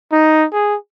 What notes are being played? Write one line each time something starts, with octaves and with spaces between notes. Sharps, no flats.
D#4
G#4